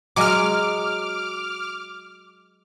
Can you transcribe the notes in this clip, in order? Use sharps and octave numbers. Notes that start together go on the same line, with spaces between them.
F#3 G#3 F#4 D6 F6